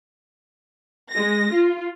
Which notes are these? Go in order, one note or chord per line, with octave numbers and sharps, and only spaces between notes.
G#3 A#6
F4